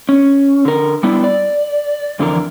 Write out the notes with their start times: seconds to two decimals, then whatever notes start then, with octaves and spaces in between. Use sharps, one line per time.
0.09 C#4
0.65 D3 A#4
1.03 G3 B3 D4 E4
1.24 D5
2.19 F2 D3 E3 D4 A#4